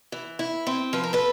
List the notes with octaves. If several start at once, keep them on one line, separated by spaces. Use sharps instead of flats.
E3
E4
C4
F3 B4
A#4
A4 B4